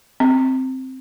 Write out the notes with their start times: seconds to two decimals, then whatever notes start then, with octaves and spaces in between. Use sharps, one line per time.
0.20 C4